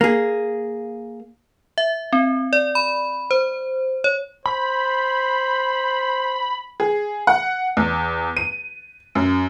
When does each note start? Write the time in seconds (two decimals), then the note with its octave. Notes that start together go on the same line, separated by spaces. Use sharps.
0.01 A#3 G#4
1.78 E5
2.13 C4
2.53 D5
2.75 B5
3.31 C5
4.04 C#5
4.46 C5 B5
6.80 G#4
7.27 F#5
7.77 E2
8.37 D#7
9.15 F#2